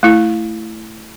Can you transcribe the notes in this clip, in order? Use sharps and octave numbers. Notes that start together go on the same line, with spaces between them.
A3 E4